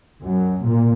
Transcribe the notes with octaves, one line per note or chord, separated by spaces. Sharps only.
F#2
A#2